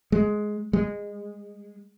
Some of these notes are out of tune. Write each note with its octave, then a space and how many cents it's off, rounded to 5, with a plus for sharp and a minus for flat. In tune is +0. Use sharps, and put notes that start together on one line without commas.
G#3 +10
G#3 -20